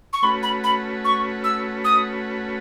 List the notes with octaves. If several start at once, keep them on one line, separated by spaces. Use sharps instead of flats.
C#6
A3 C#4 F#4 B4 B5
B5
B5
C#6
E6
D#6